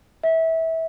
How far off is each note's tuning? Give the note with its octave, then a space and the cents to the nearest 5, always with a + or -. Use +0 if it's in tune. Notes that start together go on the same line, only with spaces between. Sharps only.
E5 -25